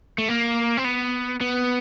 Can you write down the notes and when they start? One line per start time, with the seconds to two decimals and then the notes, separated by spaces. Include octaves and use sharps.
0.18 A3
0.29 A#3
0.77 C4
0.85 B3
1.41 B3